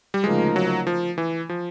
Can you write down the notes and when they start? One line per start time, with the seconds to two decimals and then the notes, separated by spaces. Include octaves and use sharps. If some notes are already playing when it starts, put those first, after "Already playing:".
0.14 G3
0.24 D2 C#3 F3 G#3 A#3 D#4
0.56 F#3
0.87 F3
1.18 E3
1.49 F3